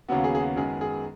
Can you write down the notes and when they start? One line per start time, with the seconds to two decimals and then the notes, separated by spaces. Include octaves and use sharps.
0.08 D#2 C#3 F#3 B3 F#4
0.24 G#4
0.35 G#4
0.40 F#4
0.56 F#2 D#3 G#3 B3 G#4
0.81 G#4